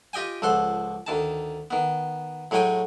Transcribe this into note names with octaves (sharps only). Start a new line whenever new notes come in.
F4 G4 D#5 G5 G#5
C#2 F3 A4 F#5 C6
D2 D#3 A5
D#3 B3
A2 F#3 G#3 C#5 G5 G#5